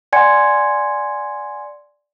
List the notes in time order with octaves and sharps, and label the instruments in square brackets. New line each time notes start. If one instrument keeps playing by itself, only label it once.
[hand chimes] D5 F#5 G#5 C6 G#6 C#7